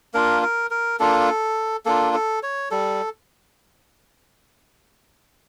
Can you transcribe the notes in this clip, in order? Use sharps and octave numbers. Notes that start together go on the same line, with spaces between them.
A#3 D4 F4 A#4
A#4
A#4
A#3 D4 F4 A4
A#3 D4 F4 A4
A4
C#5
G3 A4